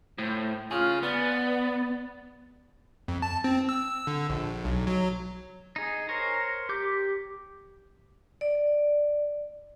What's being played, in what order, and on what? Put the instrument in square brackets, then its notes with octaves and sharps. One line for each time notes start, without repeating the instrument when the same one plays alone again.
[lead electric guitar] A2 [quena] C5
[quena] F4 [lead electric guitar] G#4 C#5
[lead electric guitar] B3 [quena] D5
[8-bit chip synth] F2
A5
C4
E6
D3
A#1
B1
F#3
[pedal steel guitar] D#4 G#4
A#4 C5 C#5 A#5
G4 D6 G6
[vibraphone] D5